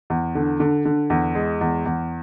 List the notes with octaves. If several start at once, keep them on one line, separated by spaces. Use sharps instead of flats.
E2
D3
D3
D3
E2
G#3
E2
E2